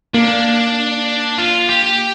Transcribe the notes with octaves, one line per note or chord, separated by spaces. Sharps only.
A#3 D4
F4
G4